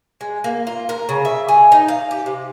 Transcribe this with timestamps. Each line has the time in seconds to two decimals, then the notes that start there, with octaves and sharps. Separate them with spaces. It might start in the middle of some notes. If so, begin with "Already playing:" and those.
0.21 G#3
0.44 A#3
0.67 F4
0.89 A#4
1.09 C#3
1.25 E5
1.48 G#4
1.72 D#4
1.88 F5
2.11 G4
2.26 C3